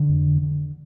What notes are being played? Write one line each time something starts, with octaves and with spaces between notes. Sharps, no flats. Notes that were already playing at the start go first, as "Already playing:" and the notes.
Already playing: D3
F2
D3